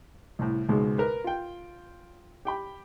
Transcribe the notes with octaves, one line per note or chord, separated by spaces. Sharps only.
C2 A2
C#2 G#2 B2 G#3
A#4 B4
F4 G5
G4 G5 B5